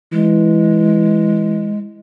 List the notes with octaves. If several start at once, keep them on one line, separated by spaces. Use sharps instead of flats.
E3 G#3